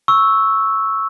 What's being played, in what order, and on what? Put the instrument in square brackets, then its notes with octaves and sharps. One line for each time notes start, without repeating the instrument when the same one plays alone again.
[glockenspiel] C#6 E6